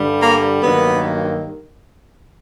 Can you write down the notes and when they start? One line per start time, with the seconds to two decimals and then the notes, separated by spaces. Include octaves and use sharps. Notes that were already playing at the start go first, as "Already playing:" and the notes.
Already playing: G2 D3 G3
0.21 A#3
0.63 G2 D#3 F#3 A#3 B3